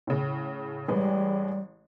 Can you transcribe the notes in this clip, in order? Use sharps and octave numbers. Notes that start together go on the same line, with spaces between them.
A2 C#3
A1 G3 G#3 B4